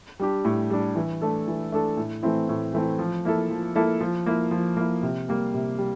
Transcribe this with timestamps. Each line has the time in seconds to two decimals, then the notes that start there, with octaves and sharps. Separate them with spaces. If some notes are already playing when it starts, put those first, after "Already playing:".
0.20 G3 D4 G4
0.45 A2
0.70 G3 D4 G4
0.96 E3
1.22 A3 D4 A4
1.48 E3
1.72 A3 D4 A4
1.97 A2
2.23 E3 A3 C4 E4
2.49 A2
2.73 E3 A3 C4 E4
2.99 F3
3.25 A#3 E4 A4
3.50 F3
3.76 A#3 E4 A4
4.01 F3
4.26 A#3 E4
4.51 F3
4.77 A#3 E4
5.03 C3
5.29 G3 A#3
5.54 C3
5.79 G3